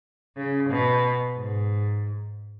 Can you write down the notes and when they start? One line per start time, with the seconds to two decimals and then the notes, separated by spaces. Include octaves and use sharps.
0.36 C#3
0.69 B2
1.36 G#2